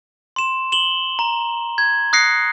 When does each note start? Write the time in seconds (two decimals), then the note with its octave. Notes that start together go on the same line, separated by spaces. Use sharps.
0.36 C6 E7
0.72 E7 F#7 G7
1.19 A#5
1.78 G#6
2.13 D#6 F#6 A#6 C7 C#7